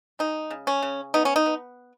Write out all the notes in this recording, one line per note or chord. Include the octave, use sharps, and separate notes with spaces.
G#3 D#4
C#3
C#4
C#3
B3 D#4
C#4
D#4
B3